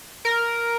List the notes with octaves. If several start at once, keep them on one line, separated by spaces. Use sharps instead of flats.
A#4